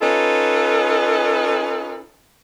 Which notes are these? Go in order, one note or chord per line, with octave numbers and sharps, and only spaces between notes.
C#4 D#4 F4 A4 B4